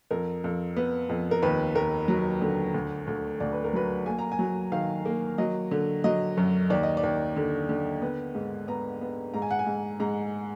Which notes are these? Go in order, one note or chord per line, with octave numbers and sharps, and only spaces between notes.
F2 A#4
F2
B3
F2
A#4
D#2 B4
D#2 A#4
F#3
D3
D2
D2
D2 D5
B4
A#4
F#3 B4
A#3 G#5
A#5
G#5
F#3
D#3 F5
A#3
F#3 D#5
D3
F#3 D#5
F#2
D#2 D5
D#5
D5
D#2
D3
D3
B3
G#2
B3 A#5
B3
G#2 A#5
G#5
F#5
G#5
G#2
G#2 A#5